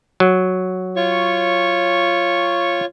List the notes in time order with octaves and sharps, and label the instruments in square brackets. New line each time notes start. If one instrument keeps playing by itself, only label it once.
[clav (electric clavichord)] F#3
[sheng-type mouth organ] F4 C#5 C#6